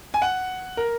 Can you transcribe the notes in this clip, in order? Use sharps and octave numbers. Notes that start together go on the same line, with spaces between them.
G#5
F#5
A#4